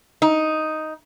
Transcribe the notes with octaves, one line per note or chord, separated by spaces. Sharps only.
D#4